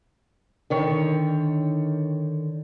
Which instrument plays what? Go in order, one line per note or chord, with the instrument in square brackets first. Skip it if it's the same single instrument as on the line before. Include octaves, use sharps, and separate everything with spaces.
[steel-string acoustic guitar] D3 D#3 C#5